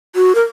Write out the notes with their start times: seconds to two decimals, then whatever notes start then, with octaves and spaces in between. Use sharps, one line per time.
0.16 F#4
0.35 A#4